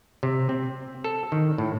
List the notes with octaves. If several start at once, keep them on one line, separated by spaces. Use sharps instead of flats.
C3
C4
A4
D#3
A2